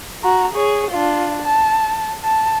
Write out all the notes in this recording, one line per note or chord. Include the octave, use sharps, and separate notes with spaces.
F#4 A#5
G#4 C#5
D4 F4
A5
A5